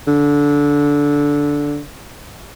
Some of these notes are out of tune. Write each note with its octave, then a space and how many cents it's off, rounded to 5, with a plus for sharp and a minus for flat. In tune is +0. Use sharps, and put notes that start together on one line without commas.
D3 -15